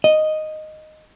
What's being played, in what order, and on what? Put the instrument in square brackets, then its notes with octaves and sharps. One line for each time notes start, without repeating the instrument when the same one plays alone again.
[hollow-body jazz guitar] D#5